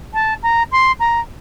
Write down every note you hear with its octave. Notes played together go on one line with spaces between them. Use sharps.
A5
A#5
C6
A#5